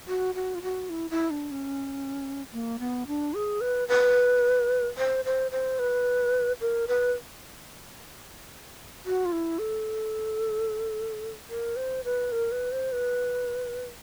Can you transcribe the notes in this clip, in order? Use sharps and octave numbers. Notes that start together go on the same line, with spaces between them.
F#4
F#4
F4
F#4
E4
E4
D4
C#4
A#3
B3
D4
G#4
B4
B4
C5
C5
C5
B4
A#4
B4
F#4
F4
E4
A4
A#4
C5
B4
A#4
B4
C5
B4